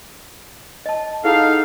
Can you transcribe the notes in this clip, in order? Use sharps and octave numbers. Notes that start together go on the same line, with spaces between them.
D#5 A5
D#4 E4 G#4 A4 F5 F#5